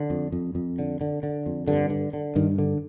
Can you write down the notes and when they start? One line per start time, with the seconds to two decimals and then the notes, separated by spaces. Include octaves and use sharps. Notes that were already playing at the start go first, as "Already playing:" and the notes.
Already playing: D3
0.10 F2
0.32 F2
0.55 F2
0.79 D3
1.01 D3
1.23 D3
1.46 F2
1.68 G2 D3
1.90 D3
2.13 D3
2.36 G2 D#3
2.58 D3